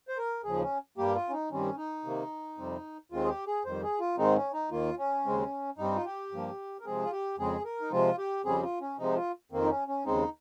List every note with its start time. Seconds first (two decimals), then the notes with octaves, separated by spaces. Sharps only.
0.08 C5
0.18 A#4
0.44 D#2 C#3 F3 G#4
0.62 C#4
0.98 G2 G3 A#3 G4
1.16 F4
1.29 C#4
1.33 D#4
1.51 G2 D#3 G3 C4 C#4
1.77 D#4
2.05 C3 D#3 A#3
2.58 F2 C3 G3 C4
3.12 D#2 D#3 G#3 C4 F4
3.24 G#4
3.28 G4
3.47 G#4
3.65 F2 D#3 G3 C5
3.83 G#4
4.00 F4
4.18 G#2 D#3 G#3 C4 D#4
4.36 C#4
4.54 D#4
4.71 D#2 D#3 A#3 F4
4.98 C#4
5.25 D#2 C#3 G#3 C4
5.78 G2 G3 C4 D#4
5.96 F4
6.05 G4
6.32 G2 F3 A#3
6.81 A#4
6.85 C3 F3 G#3 C4 G#4
7.04 F4
7.12 G4
7.38 F2 C#3 G#3 C4 G#4
7.65 A#4
7.81 D#4
7.91 C3 F3 G#3 C4 F4
8.18 G4
8.45 F2 C#3 G3 C4 G#4
8.63 F4
8.81 C#4
8.98 C3 F3 G#3 C4 D#4
9.16 F4
9.52 F2 D#3 A#3 C4
9.63 D#4
9.70 C#4
9.88 C#4
10.05 D#2 C#3 G#3 C4 D#4